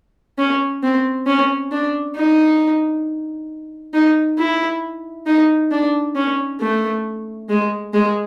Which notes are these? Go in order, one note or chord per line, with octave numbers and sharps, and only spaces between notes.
C#4
C4
C#4
D4
D#4
D#4
E4
D#4
D4
C#4
A3
G#3
G#3